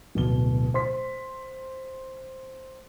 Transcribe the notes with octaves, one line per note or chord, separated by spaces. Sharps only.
D1 B2 G7
C5 C6 B6